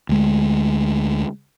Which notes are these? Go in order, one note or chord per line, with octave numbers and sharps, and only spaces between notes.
D2 G#3